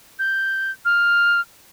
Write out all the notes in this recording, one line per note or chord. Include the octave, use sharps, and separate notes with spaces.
G6
F6